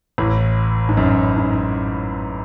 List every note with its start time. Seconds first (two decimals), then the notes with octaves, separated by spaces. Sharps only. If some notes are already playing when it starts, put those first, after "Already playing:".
0.18 A1 A2
0.89 G#2
0.97 F#2
1.37 G#2